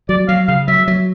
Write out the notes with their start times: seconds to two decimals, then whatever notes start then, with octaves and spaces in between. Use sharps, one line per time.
0.09 F#3 D5
0.29 F#3 F5
0.48 C#3 F5
0.68 F#3 E5
0.88 F#3